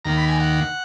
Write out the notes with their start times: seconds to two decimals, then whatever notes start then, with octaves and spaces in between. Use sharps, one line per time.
0.05 D#2 D#3 A#3 A#5
0.17 B5
0.28 G#5
0.40 F#5